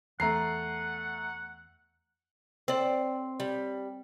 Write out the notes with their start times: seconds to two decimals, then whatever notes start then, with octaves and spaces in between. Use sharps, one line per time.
0.20 E2 A3 F#5 A#5 C7
2.68 C4 D5
3.40 G3